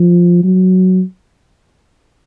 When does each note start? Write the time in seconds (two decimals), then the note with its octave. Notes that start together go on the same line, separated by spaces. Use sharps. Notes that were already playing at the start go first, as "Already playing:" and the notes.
Already playing: F3
0.44 F#3